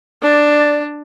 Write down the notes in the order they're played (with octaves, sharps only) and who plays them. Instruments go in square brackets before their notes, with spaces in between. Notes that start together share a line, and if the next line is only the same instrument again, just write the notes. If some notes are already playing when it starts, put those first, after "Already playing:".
[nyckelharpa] D4 [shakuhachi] D5